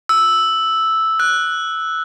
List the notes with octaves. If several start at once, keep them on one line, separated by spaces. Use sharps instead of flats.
E6
F#6